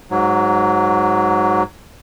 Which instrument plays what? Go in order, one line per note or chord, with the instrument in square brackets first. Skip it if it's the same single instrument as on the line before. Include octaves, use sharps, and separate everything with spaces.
[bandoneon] G#2 F#3